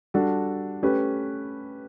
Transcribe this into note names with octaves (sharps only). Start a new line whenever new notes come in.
G3 D4 F#4 A4
A3 C#4 G4 B4